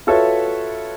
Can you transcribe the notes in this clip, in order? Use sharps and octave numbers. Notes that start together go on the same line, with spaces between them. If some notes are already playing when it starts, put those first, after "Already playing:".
F4 F#4 A4 B4 C#5 E5